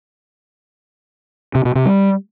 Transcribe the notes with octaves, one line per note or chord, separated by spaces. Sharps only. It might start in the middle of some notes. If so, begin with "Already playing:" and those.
C3
B2
C3
G3